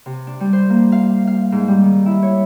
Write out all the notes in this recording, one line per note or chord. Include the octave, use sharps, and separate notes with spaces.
C3
D4
G3
C5
A#3
F5
F5
G#2
G3
D#3
E4
C#5